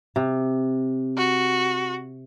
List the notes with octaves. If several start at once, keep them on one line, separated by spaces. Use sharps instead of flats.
C3
F#4